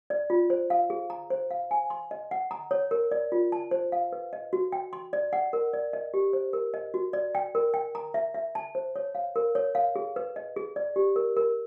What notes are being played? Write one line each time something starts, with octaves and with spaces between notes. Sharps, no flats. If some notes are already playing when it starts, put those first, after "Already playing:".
D5
F4
C5
F5
G#4
A#5
C5
F5
G#5
C6
D#5
F#5
A#5
C#5
A#4
D5
F4
A5
C5
F5
B4
D#5
F#4
G5
C6
D5
F#5
A#4
D5
D#5
G4
C5
A#4
D#5
F#4
D5
G5
A#4
G5
A#5
E5
E5
A5
C5
C#5
F5
A#4
C#5
F5
G#4
B4
D#5
G#4
D5
G4
A#4
A#4